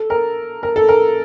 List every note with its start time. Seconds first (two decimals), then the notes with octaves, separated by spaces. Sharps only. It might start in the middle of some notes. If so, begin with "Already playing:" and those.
Already playing: A4
0.10 A#4
0.63 A#4
0.76 A4
0.89 A#4